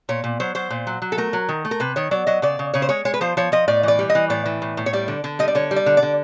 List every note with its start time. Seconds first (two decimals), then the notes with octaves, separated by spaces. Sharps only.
0.09 A#2 C#5
0.24 A#2
0.40 F#3 C5
0.55 F#3 C5
0.70 A#2
0.87 F#3
1.02 F#3
1.12 A4
1.18 A3 A#4
1.33 F#3
1.49 D#3
1.65 A3
1.71 A#4
1.80 C3 B4
1.96 D#3 C#5
2.11 F#3 D5
2.27 F#3 D#5
2.42 C#3 D5
2.59 C#3
2.74 C#3 C#5
2.82 C5
2.89 G#3 C#5
3.05 G#3 C#5
3.14 B4
3.21 F3 C5
3.37 F3 C#5
3.52 F3 D#5
3.68 A2 D5
3.83 E3 D5
3.99 G3
4.10 D#5
4.15 E3
4.30 A2 D5
4.46 E3
4.62 A2
4.77 A2
4.86 C#5
4.93 G3 D5
5.08 D3
5.24 D3
5.39 G3 D#5
5.48 D5
5.55 D3 C#5
5.71 G3
5.76 D5
5.86 D3
5.97 D5
6.03 D3